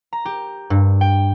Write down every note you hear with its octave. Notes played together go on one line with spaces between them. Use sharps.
A#5
G4
G2
G5